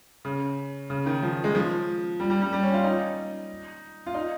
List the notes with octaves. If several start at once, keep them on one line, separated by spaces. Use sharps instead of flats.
C#3
C#3
D#3
F3
G#3
F3
G3
G3
G3
G3
C#4
F4
D#4
F4
D#4